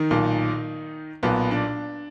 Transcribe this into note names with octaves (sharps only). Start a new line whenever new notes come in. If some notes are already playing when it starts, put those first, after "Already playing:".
Already playing: D#3 D#4
B1 A#2
B1 A#2 B3
D4